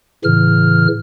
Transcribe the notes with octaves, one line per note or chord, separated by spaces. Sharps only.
A2 C#3 E3 F6